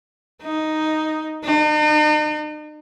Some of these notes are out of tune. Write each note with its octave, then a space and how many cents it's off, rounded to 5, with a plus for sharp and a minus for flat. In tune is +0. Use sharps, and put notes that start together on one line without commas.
D#4 +0
D#4 -45